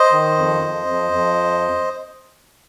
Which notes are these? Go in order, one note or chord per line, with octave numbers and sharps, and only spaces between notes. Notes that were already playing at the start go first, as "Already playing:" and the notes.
Already playing: C5 D#5
D#3
F2
F2
F2
F2